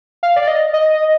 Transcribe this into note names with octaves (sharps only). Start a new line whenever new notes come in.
F5
D5
D#5
D#5